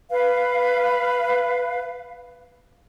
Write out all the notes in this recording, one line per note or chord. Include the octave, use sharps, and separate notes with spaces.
B4 F5